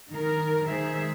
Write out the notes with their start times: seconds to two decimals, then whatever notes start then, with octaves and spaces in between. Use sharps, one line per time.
0.10 D#3 A#4
0.67 D#3 G#3 G#4 C5 E5